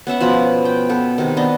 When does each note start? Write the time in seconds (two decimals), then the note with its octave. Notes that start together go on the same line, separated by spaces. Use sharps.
0.07 B3 C#4 E5 F#5
0.20 B2 F3 B4 B5
0.65 G5
0.89 B3 A4 B4
1.18 C3 D#3
1.37 B3 D4 D#5